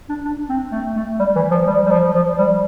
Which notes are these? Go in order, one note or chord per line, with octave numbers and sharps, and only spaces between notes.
D4
D4
C4
A3
A3
G3
E3
F3
G3
G3
F3
F3
G3